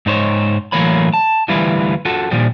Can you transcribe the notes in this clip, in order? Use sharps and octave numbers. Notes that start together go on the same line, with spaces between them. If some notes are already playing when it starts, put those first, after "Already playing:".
G#2 D#4 C5 C#5
A2 E3 F#3 A#3 C#5 B5
A5
D2 E3 G3 E4 F4 B4
F4 F#4 A4
A#2 D#3 F3 G3